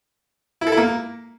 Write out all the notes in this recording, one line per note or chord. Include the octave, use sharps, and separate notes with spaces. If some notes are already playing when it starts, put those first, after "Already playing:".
E4
A4
E4
A#3